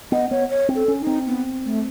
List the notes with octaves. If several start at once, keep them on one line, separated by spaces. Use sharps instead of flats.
B3 D#5
B3 C#5
C#5
C4
A4
C#4
D#4
C4
B3
A3